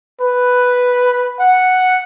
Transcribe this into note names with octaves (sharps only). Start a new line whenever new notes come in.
B4
F#5